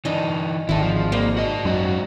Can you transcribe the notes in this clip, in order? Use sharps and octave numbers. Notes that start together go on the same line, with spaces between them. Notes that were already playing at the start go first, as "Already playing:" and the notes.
G2 E3 D4 D#4 D#5
G#1 D3 D#3 G#3 E4 A4
F3
G#2 G3 A#3 D#4
F#4 D#5
F#2 G#3 F#4